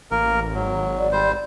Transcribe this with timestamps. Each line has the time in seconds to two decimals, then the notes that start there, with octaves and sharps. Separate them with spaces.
0.11 A1 A#3 A#4
0.55 G#1 F#3
0.99 D5
1.12 G3 C5